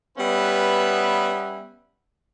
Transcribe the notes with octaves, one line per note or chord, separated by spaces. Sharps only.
G3 B3 C#4 B4 E5